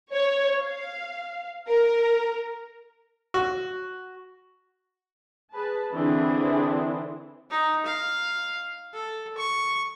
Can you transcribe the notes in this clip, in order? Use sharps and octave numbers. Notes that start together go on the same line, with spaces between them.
C#5
F5
A#4
F#4
G#4 B4 A5
D3 E3 C4 D4 E4 G#4
D#4
F5
A4
C#6